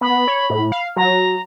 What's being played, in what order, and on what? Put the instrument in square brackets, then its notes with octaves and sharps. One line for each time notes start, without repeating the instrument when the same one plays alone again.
[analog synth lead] B3 [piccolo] B5
[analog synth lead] C#5
A2
F5
[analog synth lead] F#3 [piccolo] A#5